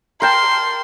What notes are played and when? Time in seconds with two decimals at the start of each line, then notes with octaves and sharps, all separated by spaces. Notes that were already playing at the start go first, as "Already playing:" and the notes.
0.22 A#4 G5 A5 C6